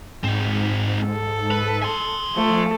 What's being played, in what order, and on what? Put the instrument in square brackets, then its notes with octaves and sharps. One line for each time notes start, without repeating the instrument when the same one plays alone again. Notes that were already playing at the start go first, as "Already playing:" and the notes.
[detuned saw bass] G#2 [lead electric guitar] C4 D#4
[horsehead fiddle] A4
[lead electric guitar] B4
G#5 C6
[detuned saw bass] F3 [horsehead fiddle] A3 A4